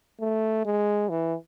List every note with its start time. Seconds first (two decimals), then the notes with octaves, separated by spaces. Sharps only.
0.21 A3
0.65 G#3
1.10 E3